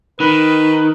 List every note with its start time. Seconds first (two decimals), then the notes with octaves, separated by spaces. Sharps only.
0.20 D#3 B4